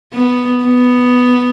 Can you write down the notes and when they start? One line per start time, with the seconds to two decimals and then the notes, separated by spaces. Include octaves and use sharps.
0.13 B3
0.64 B3